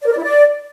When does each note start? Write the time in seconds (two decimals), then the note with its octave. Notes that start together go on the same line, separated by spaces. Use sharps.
0.01 D5
0.07 A#4
0.12 D5
0.17 E4
0.23 D5